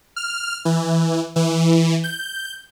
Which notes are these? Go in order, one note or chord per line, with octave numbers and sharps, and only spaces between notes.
F6
E3
E3
G6